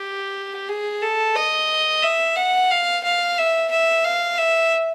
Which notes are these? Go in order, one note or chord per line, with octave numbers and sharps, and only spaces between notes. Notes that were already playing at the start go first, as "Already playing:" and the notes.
Already playing: G4
G#4
A4
D#5
E5
F#5
F5
F5
E5
E5
F5
E5